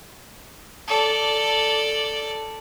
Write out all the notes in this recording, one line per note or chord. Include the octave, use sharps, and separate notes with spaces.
A4 D5